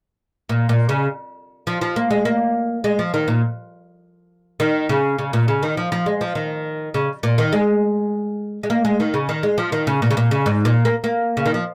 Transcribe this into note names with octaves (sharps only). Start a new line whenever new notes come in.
A#2
A#2
C#3
F3
F3
A#3
G#3
A#3
G#3
F3
D#3
A#2
D#3
C#3
C#3
A#2
C#3
D#3
F3
F3
G#3
F3
D#3
C#3
A#2
D#3
G#3
G#3
A#3
G#3
D#3
C#3
D#3
G#3
F3
D#3
C#3
A#2
C#3
A#2
C#3
G#2
A#2
A#3
A#3
C#3
D#3
F3